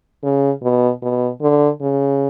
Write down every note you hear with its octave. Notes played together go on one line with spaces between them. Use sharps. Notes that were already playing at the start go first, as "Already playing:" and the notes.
C#3
B2
B2
D3
C#3